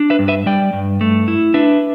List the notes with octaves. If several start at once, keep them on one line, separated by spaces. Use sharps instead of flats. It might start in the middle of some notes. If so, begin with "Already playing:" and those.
Already playing: D4
B4 E5
G2
B4 E5
G3 D5 G5
G2
A3
E4
D4 B4 E5